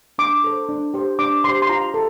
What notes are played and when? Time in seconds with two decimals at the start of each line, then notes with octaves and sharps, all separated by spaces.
0.18 D4 D6
0.44 A4 C5
0.69 D4
0.94 G4 C5
1.19 D4 D6
1.44 G4 C5 C6
1.62 C6
1.69 F4 A#5
1.94 A4